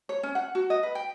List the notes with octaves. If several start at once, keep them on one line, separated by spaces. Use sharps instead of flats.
C#5
C#4
F#5
F#4
D#5
B4
G5